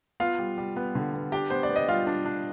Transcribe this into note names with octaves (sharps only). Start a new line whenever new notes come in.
B3 F4 F5
G3
G3
B3
D3
B3
D4 G4 G5
B3 C5
D5
B3
D#5
G3 F4 F5
D4
D4